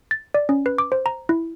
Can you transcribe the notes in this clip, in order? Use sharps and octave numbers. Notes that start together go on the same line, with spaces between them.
A6
D5
C#4
B4
D6
C5
A#5
E4